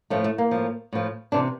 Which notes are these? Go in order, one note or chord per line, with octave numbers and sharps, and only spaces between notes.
A2 F3 A3
A3
A#3
A2 F3
A2 F3
C3 E3 D4